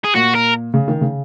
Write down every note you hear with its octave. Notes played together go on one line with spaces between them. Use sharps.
G#4
A#2 F#4
A#4
C#3
D#3
C#3